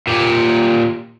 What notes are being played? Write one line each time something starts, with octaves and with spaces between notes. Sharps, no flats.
A#2 G4